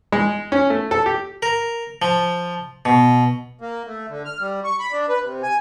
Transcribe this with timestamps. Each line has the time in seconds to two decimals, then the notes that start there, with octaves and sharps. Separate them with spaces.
0.12 G#3
0.52 C#4
0.70 A3
0.91 A4
1.06 G4
1.42 A#4
2.02 F3
2.85 B2
3.61 A#3
3.87 A3
4.09 D3
4.25 F6
4.40 G3
4.64 C#6
4.79 B5
4.92 D4
5.09 B4
5.24 C3
5.43 G#5